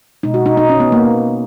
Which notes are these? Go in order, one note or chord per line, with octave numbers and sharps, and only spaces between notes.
B2 G#3 D#4
F#4
D#4
D#4
C#4
B3
A#3